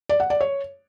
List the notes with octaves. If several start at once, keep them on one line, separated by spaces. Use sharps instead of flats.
D5
F#5
D5
C#5